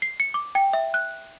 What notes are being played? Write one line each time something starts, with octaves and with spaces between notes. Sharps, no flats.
C7
C#7
D6
G5
E5
F#6